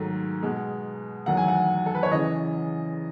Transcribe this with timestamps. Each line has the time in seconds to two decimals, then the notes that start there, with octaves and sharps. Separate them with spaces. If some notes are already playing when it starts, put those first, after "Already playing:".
Already playing: G#2 D#3 F#3 A3
0.43 B2 G#3
1.26 E2 D#3 F#3 A3 F#5
1.37 G#5
1.48 F#5
1.86 A4
1.95 B4
2.03 C#5
2.11 E2 C#3 E3 D#5